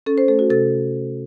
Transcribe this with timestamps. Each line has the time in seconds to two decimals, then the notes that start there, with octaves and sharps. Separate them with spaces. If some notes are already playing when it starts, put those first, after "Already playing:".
0.06 C#4 A4
0.18 C5
0.28 A3 A4
0.39 F#4
0.50 C3 A4